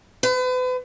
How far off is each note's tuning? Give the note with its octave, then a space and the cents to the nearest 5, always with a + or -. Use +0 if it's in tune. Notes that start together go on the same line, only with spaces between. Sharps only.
B4 +40